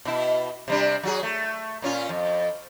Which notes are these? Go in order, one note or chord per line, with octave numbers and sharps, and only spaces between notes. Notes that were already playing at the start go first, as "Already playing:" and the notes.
B2 E4
C3 G3 D4
F#3 F#4 G#4
A3
A#2 C#4 F4
F2